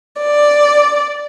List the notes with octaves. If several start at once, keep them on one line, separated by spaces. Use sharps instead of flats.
D5